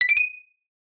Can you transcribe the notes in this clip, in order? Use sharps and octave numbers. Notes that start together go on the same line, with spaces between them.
B6
D7
D#7